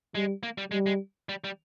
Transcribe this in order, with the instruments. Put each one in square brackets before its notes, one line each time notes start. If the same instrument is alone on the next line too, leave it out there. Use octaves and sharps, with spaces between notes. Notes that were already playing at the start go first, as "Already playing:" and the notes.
[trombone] G3 [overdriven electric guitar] G#3
[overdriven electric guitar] A#3
G3
[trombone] G3 [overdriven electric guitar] G#3
[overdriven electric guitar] G#3
G3
G3